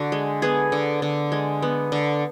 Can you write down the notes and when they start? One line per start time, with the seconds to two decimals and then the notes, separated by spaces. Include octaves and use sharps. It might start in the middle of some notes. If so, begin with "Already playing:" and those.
Already playing: D3 F#4
0.12 G#3
0.42 B3 G#4
0.72 D3
1.02 D3
1.32 G#3
1.62 B3
1.92 D3